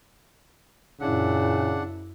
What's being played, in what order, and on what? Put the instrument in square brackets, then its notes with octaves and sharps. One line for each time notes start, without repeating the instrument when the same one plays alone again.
[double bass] F#2 E4 [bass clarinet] A#2 [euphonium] C#3 [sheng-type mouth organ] D4 F#5